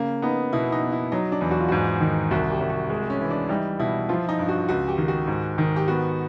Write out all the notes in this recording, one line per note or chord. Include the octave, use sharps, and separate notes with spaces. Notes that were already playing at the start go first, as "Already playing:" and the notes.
Already playing: C#3 A#3
B3 D#4
B2 E4
D#4
B3
E4
F#3 D#4
D4
E2
F#4
F4
G#2 F#4
D#3
C2 F#4
G4
C2
F#4
G#3
C#4
E3
D4
G3 D#4
B2 E4
F3 F4
D#4
G2
F#4
C#2 F#4
G4
D#3
F#4
G#2
D#3
G4
B3 F#4